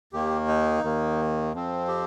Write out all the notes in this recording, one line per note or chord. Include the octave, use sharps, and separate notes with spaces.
D#2 D#3 A#3 G4
D#4
D#2 D#3 A#3
F2 F3 C4
G4